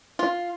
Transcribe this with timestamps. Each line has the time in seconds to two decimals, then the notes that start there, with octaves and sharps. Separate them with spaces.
0.19 F4